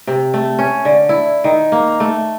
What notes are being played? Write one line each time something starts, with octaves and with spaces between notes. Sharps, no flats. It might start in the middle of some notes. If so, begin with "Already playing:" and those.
C3
A3
C#4
D3
E4
D#3
A#3
A3